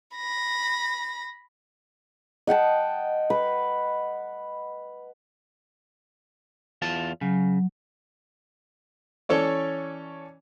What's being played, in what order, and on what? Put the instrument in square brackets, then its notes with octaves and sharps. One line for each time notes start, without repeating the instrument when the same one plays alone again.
[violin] B5 A#6
[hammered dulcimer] D#5 F#5 G5 A5
B4
[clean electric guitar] E2 F4 A5
[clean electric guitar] C#3 [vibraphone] F#3
[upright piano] E3 C#4 A4 C#5 D5